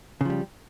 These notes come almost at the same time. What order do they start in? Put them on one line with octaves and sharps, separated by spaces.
C#3 F3 G3